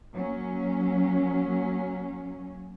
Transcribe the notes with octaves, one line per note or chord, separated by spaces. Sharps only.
F#3 A#3 C#4